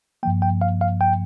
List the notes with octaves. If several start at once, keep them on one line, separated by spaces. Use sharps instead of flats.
G2 F3 A#3 G5
G5
F5
F5
G5